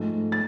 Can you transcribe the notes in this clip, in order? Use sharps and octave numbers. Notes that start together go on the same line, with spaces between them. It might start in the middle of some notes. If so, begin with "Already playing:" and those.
Already playing: G#2 F3 A3
A6